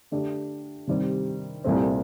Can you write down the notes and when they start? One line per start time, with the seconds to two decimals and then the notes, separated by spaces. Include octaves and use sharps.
0.12 D3 A3 D4 G4
0.87 C3 D#3 G3 C4 G4
1.64 C2 A#2 A3 C4